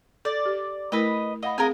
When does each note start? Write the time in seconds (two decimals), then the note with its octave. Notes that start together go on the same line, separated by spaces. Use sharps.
0.25 A4 D5
0.46 G4
0.92 A3 E4 A#4 B4 D#5
1.43 D#5 F5 F#5 B5
1.58 C4 G#4 A#4 D#5 F5 G#5